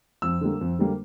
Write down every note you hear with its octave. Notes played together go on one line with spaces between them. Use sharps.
F2 E6
D3 G3 A#3
F2
D3 G3 A#3